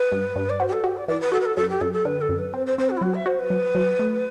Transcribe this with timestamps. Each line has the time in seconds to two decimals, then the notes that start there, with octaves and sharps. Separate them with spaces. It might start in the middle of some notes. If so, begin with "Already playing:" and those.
Already playing: B4
0.12 G2
0.36 G2
0.49 D5
0.60 F#4 C5
0.67 G4
0.72 A4
0.84 F#4 G4
0.96 D5
1.08 E3 D5
1.20 B4
1.32 F#4 A4
1.40 B4
1.45 A4
1.56 F#2 A4
1.69 G4
1.81 F#2 A4
1.92 A4
2.05 D3 B4
2.21 A4
2.29 F#2
2.38 B4
2.53 C4 C5
2.66 C5
2.78 C4 C5
2.89 F#4
2.96 E4
3.01 F#3 F#4
3.14 E5
3.26 F#4 C5
3.39 B4
3.50 F#3
3.75 F#3
3.99 A3